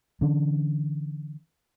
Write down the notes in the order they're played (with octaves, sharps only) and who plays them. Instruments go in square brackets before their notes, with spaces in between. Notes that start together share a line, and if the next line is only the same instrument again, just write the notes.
[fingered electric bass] D3 E3 C#4 D4